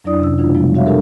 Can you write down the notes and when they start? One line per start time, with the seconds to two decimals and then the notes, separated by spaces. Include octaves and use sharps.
0.04 F2 F#3 D4 E4 D5 D#6
0.20 C3 C#4 E6
0.38 B2 E3 A3 D4 E4 F4
0.55 C3 F3 G3 G#3 B3
0.74 G3 D4 F#4 C#5 E5 F5
0.86 D4 G4 A4 A#4